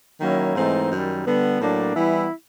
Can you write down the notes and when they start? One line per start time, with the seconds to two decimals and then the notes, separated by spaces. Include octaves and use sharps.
0.21 D#3 F#3 A#3 C#4 E4
0.56 G#2 E3 A3 C4 D#4
0.91 F#2 D#3 G3
1.25 D3 G3 B3
1.61 A2 F#3 A#3 D4
1.95 E3 G3 B3 E4